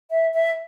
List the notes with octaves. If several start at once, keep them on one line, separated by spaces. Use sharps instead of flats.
E5
E5